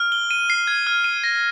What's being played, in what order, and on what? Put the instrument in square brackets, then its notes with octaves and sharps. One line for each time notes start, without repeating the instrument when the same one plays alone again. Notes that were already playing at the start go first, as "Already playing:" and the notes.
Already playing: [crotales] F6
G7
D#7
C7
G#6
F6
D#7
A#6